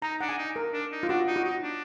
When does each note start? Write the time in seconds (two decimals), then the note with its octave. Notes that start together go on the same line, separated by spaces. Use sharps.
0.02 D#4 A#5
0.21 D4 F#5
0.29 G#5
0.38 D#4
0.56 A#4
0.73 D4
0.92 D#4
1.03 F4
1.09 D4 F#4
1.27 D#4
1.36 F#4
1.44 D#4
1.63 D4